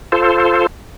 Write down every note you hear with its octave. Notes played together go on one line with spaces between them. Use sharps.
F4 A4 C5